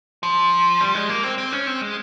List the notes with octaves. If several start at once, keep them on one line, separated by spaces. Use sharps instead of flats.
F3
G3
G#3
A#3
C4
C4
C#4
C4
G#3